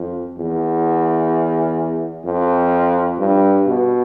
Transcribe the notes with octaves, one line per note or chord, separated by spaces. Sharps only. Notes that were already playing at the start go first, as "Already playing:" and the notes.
Already playing: F2
E2
F2
G2
B2